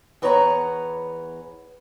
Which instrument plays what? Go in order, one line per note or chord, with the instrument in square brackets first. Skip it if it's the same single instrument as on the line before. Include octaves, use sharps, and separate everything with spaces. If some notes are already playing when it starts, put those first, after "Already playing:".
[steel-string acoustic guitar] E2 B3 B4 C#5 D#5 A#5